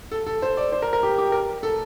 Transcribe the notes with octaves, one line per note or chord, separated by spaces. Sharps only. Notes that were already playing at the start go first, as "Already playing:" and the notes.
A4
A4
C5
D5
C5
A#4
A#4
G4
G4
A#4
A4